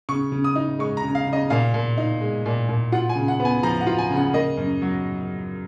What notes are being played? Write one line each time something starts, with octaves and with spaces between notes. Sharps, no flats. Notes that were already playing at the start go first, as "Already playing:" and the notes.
C#3 C#6
C#3
D#6
D#4
G#3 C#6
A#5
C#3
F5
C#3
D#5
A#2 F5
A#2
D#4
G#3
A#2
A#2
F4 F#5
G#5
C#3
F#5
B3
G#5
F3 A#5
F#5
F4
G#5
C#3
F#5
A#3 D#5
F#2
F#3